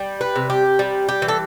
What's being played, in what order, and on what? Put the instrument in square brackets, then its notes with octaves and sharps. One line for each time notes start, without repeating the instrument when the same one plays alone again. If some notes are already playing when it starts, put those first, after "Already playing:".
Already playing: [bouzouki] G3
B4
C3
G4
G3
G4
E3
A4